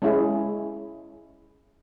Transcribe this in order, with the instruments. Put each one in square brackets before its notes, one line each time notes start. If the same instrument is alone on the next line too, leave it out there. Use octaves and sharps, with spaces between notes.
[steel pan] G#3 C#4 E4 G#4